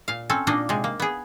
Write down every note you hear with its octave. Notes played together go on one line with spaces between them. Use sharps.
A#2 F5
C4 C#4 A4
A#2 A#3 D4 D#4 D#5
C3 G#3
A#3
B3 G#4